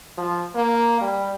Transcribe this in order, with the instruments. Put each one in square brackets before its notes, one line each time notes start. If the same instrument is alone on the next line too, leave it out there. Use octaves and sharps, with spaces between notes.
[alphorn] F3
A#3
G3